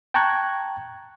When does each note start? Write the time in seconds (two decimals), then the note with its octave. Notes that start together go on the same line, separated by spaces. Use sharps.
0.14 G5 A5 A#5 C#6 F#6 G#6